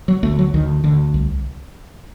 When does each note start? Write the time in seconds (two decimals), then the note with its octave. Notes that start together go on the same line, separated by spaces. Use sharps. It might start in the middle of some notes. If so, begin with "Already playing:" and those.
0.08 F#3
0.23 D2 A3
0.39 F#3
0.54 D2 D#3
0.84 D2 D3
1.14 C2